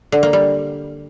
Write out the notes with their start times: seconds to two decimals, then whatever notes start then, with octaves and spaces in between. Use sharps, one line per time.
0.12 D3
0.23 A#3
0.33 G3